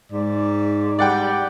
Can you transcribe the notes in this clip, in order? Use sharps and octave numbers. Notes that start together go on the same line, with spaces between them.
G#2 D5
G3 D5 F#5 G5